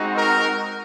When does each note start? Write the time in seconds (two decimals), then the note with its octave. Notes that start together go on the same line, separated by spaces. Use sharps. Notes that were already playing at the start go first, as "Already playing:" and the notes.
Already playing: G#3 C4 D#4 F#4
0.15 A#4